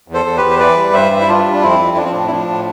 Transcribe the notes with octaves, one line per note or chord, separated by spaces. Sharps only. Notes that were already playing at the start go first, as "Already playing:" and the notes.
E2
A4 C5
E2 A4
G4 B4
E2
C5
E3 B4 D5
G3
G2 C5 E5
G2
E4
G3 D4 F4
G3
D4
F2 C4 E4
F2
F3 D4
C4
A2 D4
E4
F3 D4
A2